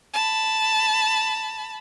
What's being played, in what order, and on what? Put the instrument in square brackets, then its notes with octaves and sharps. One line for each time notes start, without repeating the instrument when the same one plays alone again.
[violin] A5 B5